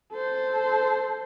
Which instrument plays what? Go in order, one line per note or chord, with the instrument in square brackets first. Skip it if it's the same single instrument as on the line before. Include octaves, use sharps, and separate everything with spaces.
[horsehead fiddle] A4 C5